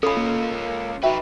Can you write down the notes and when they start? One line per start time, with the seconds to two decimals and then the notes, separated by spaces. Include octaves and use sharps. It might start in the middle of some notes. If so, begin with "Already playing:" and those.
0.03 C#4 F4 A4 B5
0.17 A#3
1.03 D#4 F#4 B4 E5 G5